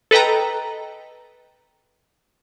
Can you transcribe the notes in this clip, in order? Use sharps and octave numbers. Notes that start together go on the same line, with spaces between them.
A4 B4 D#5 G5 A#5